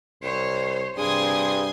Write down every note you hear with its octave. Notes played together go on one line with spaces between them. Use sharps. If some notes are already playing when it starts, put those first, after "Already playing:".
C2 C5 C#5
G2 C3 G#4 G#5 C6 D#6